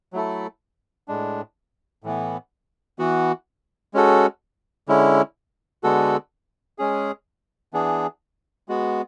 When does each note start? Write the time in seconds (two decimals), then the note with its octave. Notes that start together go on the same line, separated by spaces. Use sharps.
0.13 F#3 A3 E4 A4
1.08 A2 G#3 D4
2.04 A2 E3 B3
2.99 E3 B3 F#4
3.94 G#3 C#4 F#4 A4
4.88 D3 G#3 C#4 E4
5.83 D3 G#3 B3 F#4 A4
6.78 G#3 C#4 G#4
7.73 E3 B3 D4 G#4
8.68 G#3 B3 F#4